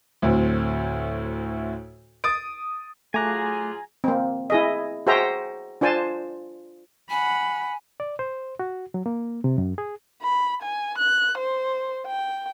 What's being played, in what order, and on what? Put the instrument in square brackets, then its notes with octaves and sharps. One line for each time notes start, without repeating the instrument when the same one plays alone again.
[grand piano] D2 A2 F#3 C4
D#6 A6 D7
[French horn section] F#3 F4 G#4 [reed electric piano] A3 D6 F#6 [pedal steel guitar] G#5 A#5
[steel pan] A#3 C4
E4 G#4 D#5
F#4 G#4 C5 E5 G5 A#5
D4 F4 C5 G#5 A5
[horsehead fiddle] F#5 B5 [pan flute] G#5
[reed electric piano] D5
C5
F#4
F#3
A#3
C3
F#2
G#4
[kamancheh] B5
G#5
F#6
C5
G5